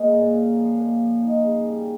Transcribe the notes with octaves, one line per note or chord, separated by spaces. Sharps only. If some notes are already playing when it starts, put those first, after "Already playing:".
Already playing: G#3 A#3
A#2
C#4
F3
A#3
F3
D#4
C#3
G3